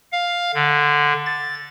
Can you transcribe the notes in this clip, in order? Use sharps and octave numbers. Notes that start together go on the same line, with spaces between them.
F5
D3
A6